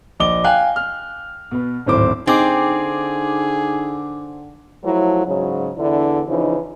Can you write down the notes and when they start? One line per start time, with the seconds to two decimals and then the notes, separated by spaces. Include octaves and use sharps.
0.20 A#1 D#5 D6 G7
0.44 F5 G5 G#5 F#6
0.76 F6
1.51 B2 B3
1.86 D1 G#1 E4 C5 D6
2.27 D3 C4 D#4 G#4 D6
4.84 F3 F#3 A3 E4
5.26 G#2 C#3 F#3
5.78 E2 D3 D4 E4
6.29 C#3 E3 F3 D#4